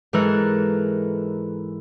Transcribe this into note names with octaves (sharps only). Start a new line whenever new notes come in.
G#2 E3 A4 A#4 F#6